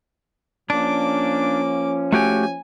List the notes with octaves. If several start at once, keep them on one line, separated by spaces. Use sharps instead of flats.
F3 A#3 C#4 D4 D6
A3 F#4 G4 G#5